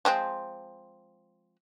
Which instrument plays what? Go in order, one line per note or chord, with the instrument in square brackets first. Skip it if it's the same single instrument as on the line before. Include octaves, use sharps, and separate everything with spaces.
[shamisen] F3 G#3 C4